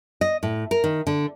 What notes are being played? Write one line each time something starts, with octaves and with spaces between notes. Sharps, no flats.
D#5
A2
A#4
D#3
D3